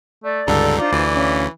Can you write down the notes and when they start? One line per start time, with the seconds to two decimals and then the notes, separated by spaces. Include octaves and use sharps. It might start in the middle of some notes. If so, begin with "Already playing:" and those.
0.23 A3 D5
0.47 C#2 G2 D3 D#4 A4
0.78 D4 F4 C5 D5
0.92 D2 E3
1.14 C#4 F5